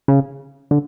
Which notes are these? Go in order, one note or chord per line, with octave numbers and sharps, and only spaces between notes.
C#3
D3